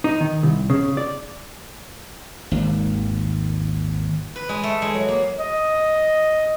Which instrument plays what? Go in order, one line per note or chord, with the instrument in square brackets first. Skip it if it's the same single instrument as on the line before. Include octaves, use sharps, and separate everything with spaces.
[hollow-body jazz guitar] D#4
D#3
C2
C#3
D5
[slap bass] G#1 D#2
[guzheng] B4
G#3
A3
G#3
F#3
A#3
[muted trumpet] D#5